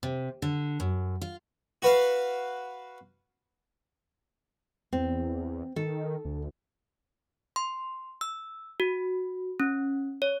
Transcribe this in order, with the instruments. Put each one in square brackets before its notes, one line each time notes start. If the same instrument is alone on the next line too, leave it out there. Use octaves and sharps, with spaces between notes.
[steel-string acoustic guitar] C3
D3
F#2
F4
[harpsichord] F#4 B4 F5
[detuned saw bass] E2 [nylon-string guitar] C4
[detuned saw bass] D#3 [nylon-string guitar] A4
[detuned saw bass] D2
[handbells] C6
E6
F#4
C#4
C#5